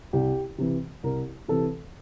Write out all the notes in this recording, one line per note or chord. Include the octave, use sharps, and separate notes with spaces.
C2 G4
C3 E3
C2 A#4
C3 E3 A4